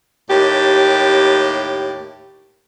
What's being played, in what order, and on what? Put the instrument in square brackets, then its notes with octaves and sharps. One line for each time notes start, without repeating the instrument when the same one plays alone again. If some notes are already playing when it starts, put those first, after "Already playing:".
[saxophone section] D#2 A2 G4